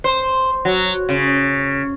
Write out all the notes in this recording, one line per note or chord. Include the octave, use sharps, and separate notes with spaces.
C5
F#3
C#3